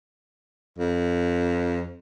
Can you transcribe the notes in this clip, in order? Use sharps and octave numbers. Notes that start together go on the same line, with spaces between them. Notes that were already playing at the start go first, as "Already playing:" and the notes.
F2